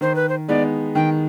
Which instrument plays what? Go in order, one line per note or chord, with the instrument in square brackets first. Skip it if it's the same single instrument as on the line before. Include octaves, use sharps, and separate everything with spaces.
[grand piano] D#3 [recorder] C5
[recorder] B4
C5
[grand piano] G#3 B3 D#4 [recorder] D5
[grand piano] D#3 [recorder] G5